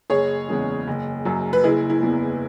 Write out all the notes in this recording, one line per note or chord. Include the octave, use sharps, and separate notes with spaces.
F#1 G#4 C#5
E2 C#3 G#3
F#1
F#2 F#3
B4
F#1 E4 G#4
E4
E2 E3 B3